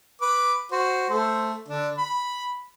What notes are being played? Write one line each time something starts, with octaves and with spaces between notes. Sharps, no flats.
B4 D6
F#4 C5
A3 A4 C5
D3 D4
B5